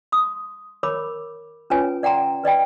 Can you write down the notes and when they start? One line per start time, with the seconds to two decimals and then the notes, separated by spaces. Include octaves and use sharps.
0.12 C6 D#6
0.83 A#4 C#5 B5 D6
1.70 C#4 F4 B4 C#5 G#5
2.03 D5 F#5 G5 A#5 C6
2.44 B4 D5 D#5 G5